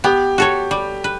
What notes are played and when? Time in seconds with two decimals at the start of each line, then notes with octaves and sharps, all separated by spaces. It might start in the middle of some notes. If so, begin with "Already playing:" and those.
0.04 B3 G4
0.38 F#4 A4 C#5
0.71 G3
1.04 B4